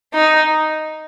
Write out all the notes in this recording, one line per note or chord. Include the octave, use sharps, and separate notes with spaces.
D#4